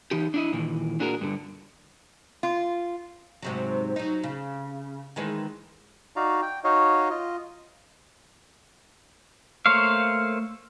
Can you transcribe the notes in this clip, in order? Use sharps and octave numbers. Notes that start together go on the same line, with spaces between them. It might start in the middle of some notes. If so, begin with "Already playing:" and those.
E3 D#4 G4
D4 E4 D#5
A#2 D#3 E3
A#2 D4 F#4 G#4 A#4
G2 D3
F4
G#2 C3 F#3
F#3 D#4
C#3
D#3 E3 G#3
D#4 F#4 D5 F5 A#5
G5
D#4 F#4 C#5 D#5 F5
F4 D#5
A3 A#3 C5 C#5 F5